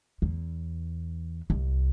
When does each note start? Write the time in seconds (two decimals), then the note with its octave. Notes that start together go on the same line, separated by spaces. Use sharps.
0.22 E2
1.50 C2